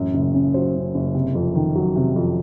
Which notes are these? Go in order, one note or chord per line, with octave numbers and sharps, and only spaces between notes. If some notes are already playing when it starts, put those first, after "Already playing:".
Already playing: A1 F#2
F#1
C#3
F#3 C5
F#2
F#1
C3
F2
D#3
F#3
C3
F2